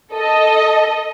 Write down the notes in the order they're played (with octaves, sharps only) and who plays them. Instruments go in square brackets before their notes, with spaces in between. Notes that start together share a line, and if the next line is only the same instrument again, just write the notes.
[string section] A4 D#5